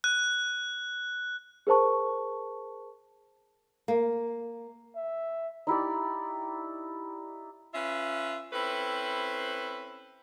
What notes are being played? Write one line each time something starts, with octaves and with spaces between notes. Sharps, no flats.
F#6
G#4 A#4 C5 A5 C#6
A#3
E5
D#4 E4 G4 D5
C#4 F4 B4 E5
C4 C#4 E4 A4 B4